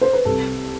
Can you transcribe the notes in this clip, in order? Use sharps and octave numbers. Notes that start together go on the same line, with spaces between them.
C5
B4
C2 A4